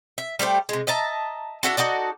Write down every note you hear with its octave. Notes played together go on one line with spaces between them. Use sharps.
E5
G3 A3 G4 C5
C3 G#3
D#5 E5 A5 A#5
D4 E4 F#4 A4
D#4 F#4 A4 D5